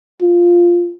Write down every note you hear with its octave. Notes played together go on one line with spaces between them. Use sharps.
F4